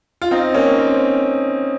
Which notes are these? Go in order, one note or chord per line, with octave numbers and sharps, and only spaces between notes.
F4
C4 D#4
A#3 C#4
C4